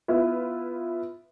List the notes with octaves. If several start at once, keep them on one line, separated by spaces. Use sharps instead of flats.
B3 E4 F4 B4